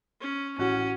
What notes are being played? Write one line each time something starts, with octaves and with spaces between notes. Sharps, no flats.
C#4
A1 C#4 F#4